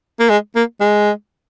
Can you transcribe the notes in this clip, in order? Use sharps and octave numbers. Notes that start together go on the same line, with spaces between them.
A#3
G#3
A#3
G#3